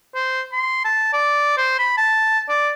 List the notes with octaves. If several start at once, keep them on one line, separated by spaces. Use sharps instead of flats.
C5
C6
A5
D5
C5
B5
A5
D5